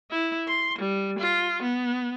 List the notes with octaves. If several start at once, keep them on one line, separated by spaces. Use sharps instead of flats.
E4
C6
G3
F4
B3